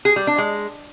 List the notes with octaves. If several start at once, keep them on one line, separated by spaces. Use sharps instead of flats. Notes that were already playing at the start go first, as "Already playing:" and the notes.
G#4
G3
D4
G#3